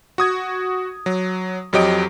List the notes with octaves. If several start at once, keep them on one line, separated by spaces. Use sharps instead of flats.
F#4 D#6 G#6
F#3
F2 F#3 G4 D#5 D7